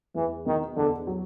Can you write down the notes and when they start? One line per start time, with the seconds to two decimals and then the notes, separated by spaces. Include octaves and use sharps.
0.15 E2 E3
0.46 B2 D#3
0.77 E2 D3
1.07 F#3